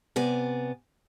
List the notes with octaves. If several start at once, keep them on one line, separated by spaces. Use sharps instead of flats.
C3 B3 D5 G#5